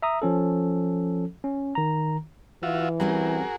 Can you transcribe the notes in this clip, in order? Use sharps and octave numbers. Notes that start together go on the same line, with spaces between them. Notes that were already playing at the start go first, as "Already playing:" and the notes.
E5 A#5 D#6
F3 C#4 A4
C#4
D#3 A#5
E3 F4 F#4 E5
G3 C4 C#4 F#4 G#4 A#4